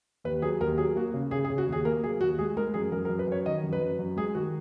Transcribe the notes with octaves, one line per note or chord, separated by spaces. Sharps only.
D#2 B4
F#3 G#4
D#2 A#4
F#3 G#4
A#3 F#4
C#3
C#3 G#4
G#4
C#3
F#4
D#2 G#4
A#3 A#4
F#3 G#4
D#2 F#4
G#3 G#4
G#3 A#4
F#2 G#4
F#2 A#4
A#4
F#2
B4
F#2 C#5
D#3 D#5
F#2
B4
F#2
F#2
G#3 G#4
D#3 F#4